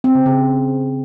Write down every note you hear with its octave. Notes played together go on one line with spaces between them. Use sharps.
C4
C#3
C#3